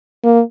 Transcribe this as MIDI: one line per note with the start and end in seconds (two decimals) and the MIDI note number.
0.24 0.41 58